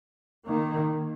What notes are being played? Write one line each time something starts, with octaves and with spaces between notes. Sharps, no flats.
D#3 A#3